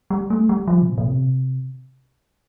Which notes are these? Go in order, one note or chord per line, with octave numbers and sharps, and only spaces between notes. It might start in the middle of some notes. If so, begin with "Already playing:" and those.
G3
A3
G3
F3
C3
A#2
A#2
C3